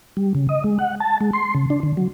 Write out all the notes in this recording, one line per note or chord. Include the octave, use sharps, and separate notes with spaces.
G3
C#3
D#5
G#3
F#5
A5
G#3
C6
C#3
D4
D3
F#3